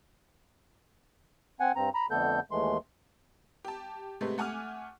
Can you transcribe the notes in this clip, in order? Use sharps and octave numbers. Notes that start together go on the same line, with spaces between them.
C4 F#5 G#5
G2 C4 A#5
A#5 B5
F2 D3 A3 B3 A4 G6
D#2 E3 G#3 A3 C6
G4 A5
C3 G#3 A3 B3
A3 F#5 G#5 D6 F6